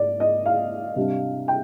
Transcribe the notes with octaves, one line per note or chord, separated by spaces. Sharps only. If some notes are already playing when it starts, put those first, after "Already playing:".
Already playing: G#2 D5
D#5
F5
C3 G3 D4
G5